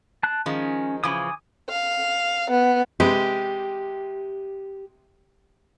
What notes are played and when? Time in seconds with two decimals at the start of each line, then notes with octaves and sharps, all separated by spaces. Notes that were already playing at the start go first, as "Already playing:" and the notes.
0.23 A5 F#6
0.46 D#3 F3 G#3 C#4
1.04 C#3 E3 F3 G#5 D6 D#6
1.70 F5
2.49 B3
3.00 C3 G#3 G4 B4